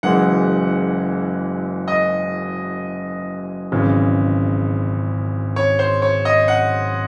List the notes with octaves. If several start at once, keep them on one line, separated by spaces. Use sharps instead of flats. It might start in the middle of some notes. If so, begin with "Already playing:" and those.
F#1 F#2 E3 G#3 F#5
D#5
G#1 F#2 C#3 E3
C#5
C5
C#5
D#5
F#5